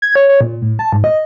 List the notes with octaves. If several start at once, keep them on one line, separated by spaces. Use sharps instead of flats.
G#6
C#5
C#5
A#2
A2
A5
G#2
D#5